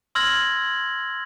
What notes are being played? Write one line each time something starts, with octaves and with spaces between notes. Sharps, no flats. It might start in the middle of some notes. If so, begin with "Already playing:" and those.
C6 E6 F6 G#6 A#6 F#7